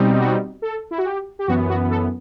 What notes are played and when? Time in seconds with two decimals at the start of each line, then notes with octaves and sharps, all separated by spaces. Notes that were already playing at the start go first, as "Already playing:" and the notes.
Already playing: B2 G3 C4 D#4
0.20 F#4
0.62 A4
0.91 E4
0.98 F#4
1.05 G4
1.39 G4
1.47 F#2 E3 B3 F#4
1.69 F#4
1.90 A4